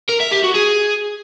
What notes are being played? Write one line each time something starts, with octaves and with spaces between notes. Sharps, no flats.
A#4
E5
G4
F#4
G#4